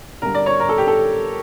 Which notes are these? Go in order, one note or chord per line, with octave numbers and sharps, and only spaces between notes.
G2 D3 A#4
D5
C#5
A#4
A4
G4
A4